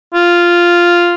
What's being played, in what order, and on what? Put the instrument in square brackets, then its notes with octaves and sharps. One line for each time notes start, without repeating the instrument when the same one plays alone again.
[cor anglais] F4